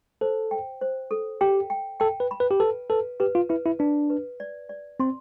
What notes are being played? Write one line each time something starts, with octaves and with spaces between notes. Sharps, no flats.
A4 C5
G5
C5
A4
G4 G5
G5
A4 G5
B4
B5
B4
G4
A4 B4
A4 B4
G4 B4
F4
E4 B4
E4
D4 B4
B4
D5
D5
C4 C6